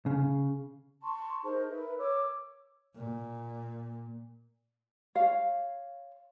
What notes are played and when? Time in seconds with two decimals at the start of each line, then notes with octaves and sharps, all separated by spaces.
0.06 C#3
1.02 A5 C6 C#6
1.43 D#4 G#4 A#4 C5
1.70 A#4 B4 E5
1.98 C#5 D6 E6
2.94 A#2
5.15 C#5 F5